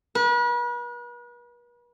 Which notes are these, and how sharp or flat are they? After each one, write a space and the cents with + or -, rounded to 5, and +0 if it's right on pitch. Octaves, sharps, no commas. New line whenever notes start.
B4 -40